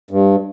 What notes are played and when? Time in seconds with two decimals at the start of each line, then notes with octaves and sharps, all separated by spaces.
0.11 G2